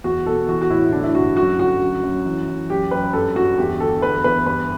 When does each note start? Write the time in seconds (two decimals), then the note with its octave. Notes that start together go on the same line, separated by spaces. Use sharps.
0.04 E2 F#4
0.26 B2 A4
0.48 E3 F#4
0.62 F#4
0.70 A2 E4
0.92 D3 D4
1.03 E4
1.15 G2 F#4
1.37 F#2 F#4
1.59 D3 F#4
1.81 F#2
2.03 F#2
2.25 E3
2.47 E3
2.70 F#2 G4
2.91 F#2 B4
3.13 G2 A4
3.36 G2 F#4
3.58 E2 G4
3.80 D3 A4
4.02 E2 B4
4.24 E2 B4
4.46 G2 B4